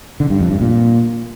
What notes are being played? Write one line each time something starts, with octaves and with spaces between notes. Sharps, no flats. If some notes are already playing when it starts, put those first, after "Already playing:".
D3
G2
F2
G2
A#2